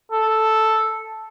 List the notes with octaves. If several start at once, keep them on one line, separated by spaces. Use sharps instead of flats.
A4